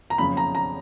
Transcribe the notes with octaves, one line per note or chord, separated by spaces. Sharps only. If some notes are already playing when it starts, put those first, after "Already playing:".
A#5
F#1 F2 C#3 B5
A#5
A#5